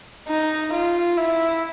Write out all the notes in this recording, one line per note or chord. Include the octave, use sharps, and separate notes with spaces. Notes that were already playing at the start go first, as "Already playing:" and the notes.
D#4
F4
E4